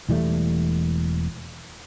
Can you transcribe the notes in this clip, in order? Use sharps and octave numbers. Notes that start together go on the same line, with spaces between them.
E1 E3 G3 A3